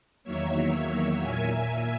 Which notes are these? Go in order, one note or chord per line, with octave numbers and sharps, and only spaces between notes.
E2 D#3 F#3 A#3 C#5 E5
A#2 A#3 E5 G#5